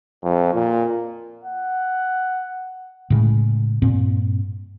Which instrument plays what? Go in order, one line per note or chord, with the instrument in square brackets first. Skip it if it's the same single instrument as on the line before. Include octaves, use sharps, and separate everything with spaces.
[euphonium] F2
A#2
[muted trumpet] F#5
[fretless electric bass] A2 C#3 G#3
G2 A#2 C4